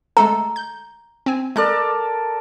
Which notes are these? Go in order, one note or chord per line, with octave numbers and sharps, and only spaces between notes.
G#3 A3 A4 A#5
G6
C4 G#5
G#3 A4 A#4 D5 F#6